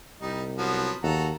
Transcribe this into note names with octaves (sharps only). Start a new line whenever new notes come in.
C2 G3 D#4
F3 F#3 B3
D#2 F#4 A4 A#5